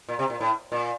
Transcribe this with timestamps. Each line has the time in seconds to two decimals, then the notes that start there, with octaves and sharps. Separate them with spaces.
0.09 A#2
0.19 C3
0.30 A#2
0.40 A2
0.72 A#2